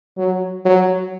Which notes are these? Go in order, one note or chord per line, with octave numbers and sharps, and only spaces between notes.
F#3
F#3